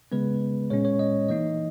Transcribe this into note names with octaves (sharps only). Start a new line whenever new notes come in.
C#3 G#3 B3 B4
A#2 G#3 C#4 C#5
C#5
D#5
E3 A#3 D#4 D#5